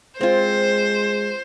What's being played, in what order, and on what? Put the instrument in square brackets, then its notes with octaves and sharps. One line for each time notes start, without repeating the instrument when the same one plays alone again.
[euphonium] G#3 [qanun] C4 F4 [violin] C5